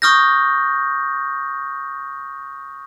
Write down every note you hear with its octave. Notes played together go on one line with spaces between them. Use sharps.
C#6 D#6 F6 G6 A#6